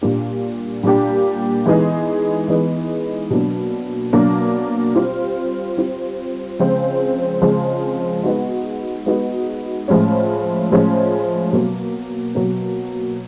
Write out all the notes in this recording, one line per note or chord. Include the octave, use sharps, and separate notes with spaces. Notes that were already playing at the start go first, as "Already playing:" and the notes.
A#2 G3 A#3 D4 G4
A#2 G3 A#3 D4 G4
E3 G#3 B3 D#4 G#4
E3 G#3 B3 D#4 G#4
B2 F#3 A#3 D4
B2 F#3 A#3 D4
G3 C4 F4
G3 C4 F4
C#3 F3 G#3 C4
C#3 F3 G#3 C4
G#3 B3 D#4 F#4
G#3 B3 D#4 F#4
A2 F3 G#3 C#4
A2 F3 G#3 C#4
B2 F#3 A#3
B2 F#3 A#3